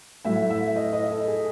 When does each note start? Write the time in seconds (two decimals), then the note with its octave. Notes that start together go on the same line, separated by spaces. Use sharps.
0.25 A2 F#3 A3 E5
0.50 E5
0.76 D#5
0.93 D#5
1.11 A4
1.28 G#4